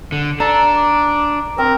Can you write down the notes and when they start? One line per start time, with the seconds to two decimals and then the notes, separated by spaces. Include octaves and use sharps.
0.12 D3
0.40 D4 A4 A#5
0.76 D6
1.58 C4 A#4